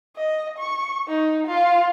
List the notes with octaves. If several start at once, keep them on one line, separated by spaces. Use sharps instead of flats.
D#5
C#6
D#4
F4